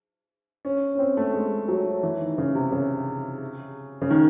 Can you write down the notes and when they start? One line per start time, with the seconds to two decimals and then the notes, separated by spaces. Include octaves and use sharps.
0.65 C#4
0.95 C#4
0.99 C4
1.17 A3
1.34 G#3
1.68 F#3
2.03 E3
2.21 D#3
2.38 C#3
2.55 C3
2.72 C#3
4.02 C#3
4.10 D#3